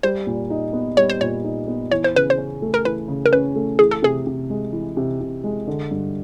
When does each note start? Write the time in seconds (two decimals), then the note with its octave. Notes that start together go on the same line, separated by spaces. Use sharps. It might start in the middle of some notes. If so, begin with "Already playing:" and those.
0.03 G3 C5
0.27 A#2
0.50 D#4
0.73 B3
0.97 G3 C#5
1.10 C5
1.21 A#2 C#5
1.44 D#4
1.68 B3
1.91 E3 C#5
2.04 C5
2.15 C#3 B4
2.30 C5
2.38 C#4
2.62 A3
2.74 A#4
2.85 E3 B4
3.08 C#3
3.26 A#4
3.32 C#4 B4
3.56 A3
3.79 E3 G#4
3.91 A4
4.02 C3 G#4
4.27 C3
4.50 G#3
4.73 E3
4.97 C3
5.21 C3
5.44 G#3
5.67 D3
5.91 G2